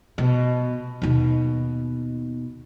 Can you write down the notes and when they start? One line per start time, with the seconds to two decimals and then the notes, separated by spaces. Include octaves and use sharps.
0.18 B2
1.02 D#2 B2